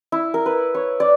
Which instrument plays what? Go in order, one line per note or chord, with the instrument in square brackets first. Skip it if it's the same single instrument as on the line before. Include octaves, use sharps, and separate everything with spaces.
[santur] E4
A#4
B4
C#5
D5